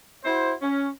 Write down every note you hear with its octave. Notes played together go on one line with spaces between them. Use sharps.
E4 F#4 C5
C#4